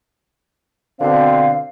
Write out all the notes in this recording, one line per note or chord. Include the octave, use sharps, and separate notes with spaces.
B2 D3 C4 F5